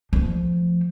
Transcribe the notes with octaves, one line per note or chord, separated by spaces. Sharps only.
F3 A3